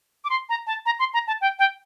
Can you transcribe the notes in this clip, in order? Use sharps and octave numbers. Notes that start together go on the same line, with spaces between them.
D6
C6
A#5
A5
A#5
C6
A#5
A5
G5
G5